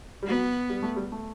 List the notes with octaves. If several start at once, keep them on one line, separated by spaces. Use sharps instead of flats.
G3
F#3 B3
G3
A3
G3
A3